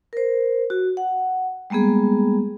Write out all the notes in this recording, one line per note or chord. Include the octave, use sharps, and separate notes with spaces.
A#4 C5
F#4
F#5
G3 G#3 A#3 B3 G#4